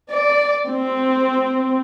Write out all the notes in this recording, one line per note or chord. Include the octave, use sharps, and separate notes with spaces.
D5
C4